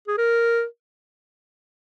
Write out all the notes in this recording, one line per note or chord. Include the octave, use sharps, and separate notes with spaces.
G#4
A#4